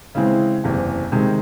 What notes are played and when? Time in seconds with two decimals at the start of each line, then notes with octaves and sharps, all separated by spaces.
0.15 C#3 E3 G#3 C4
0.64 F#1 E2 C3
1.12 C3 D#3 G#3